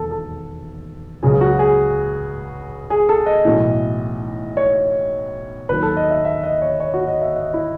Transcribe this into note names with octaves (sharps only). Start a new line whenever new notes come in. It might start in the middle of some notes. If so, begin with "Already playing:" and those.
Already playing: E1 D#2 A4
A4
C#2 C#3 F#3 G#4
F#4
G#4
G#4
A4
D#5
B1 A2 E3
C#5
D#2 D#3 F#3 B4
A4
D#5
E5
E5
D#5
C#5
C#5
F#4
D#5
E5
D#5
E4